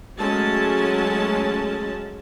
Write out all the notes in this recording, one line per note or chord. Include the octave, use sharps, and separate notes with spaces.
F#3 G#3 A3 C#4 A5